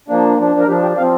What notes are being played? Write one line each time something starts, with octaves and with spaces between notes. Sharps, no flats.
F3 A#3 D4
F3 D4
A#4
F3 D4 G4
G4
F3 C4 F5